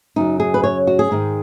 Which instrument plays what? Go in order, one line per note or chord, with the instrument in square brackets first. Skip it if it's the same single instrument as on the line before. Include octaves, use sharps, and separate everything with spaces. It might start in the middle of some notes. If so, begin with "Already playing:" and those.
[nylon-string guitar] F#2 C#3 F#3 D#4
G#4
B4
C#5
F#4
G#4
G#2 D#3 G#3